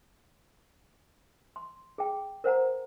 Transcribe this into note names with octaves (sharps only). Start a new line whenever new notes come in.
C6
G#4 G5
A#4 C5 F#5 A#5